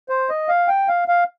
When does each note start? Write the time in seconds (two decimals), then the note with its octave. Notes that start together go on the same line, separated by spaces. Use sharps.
0.09 C5
0.30 D#5
0.49 F5
0.68 G5
0.88 F5
1.08 F5